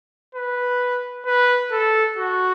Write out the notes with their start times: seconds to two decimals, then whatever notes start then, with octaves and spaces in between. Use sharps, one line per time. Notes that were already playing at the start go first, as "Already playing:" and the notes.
0.35 B4
1.26 B4
1.72 A4
2.18 F#4